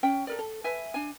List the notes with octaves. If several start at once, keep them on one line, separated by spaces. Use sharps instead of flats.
C#4 G5
A4 A#4 D5
A4
B4 E5 G#5
D4 G#5